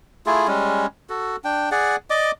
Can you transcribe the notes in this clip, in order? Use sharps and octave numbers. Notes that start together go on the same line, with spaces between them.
A3 E4 F4 G#4
G3 G#3 C#4
F#4 A4
D4 G5
G#4 D5 F#5
D5 D#5 D6